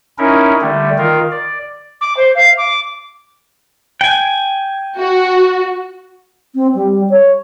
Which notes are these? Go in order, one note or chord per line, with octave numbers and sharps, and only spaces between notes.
C#4 D#4 E4 A#4
D3 G3 A3
D#3 F4 A#4
D5
D6
C5
F5
D6
G5 G#5
F#4
C4
G3
C#5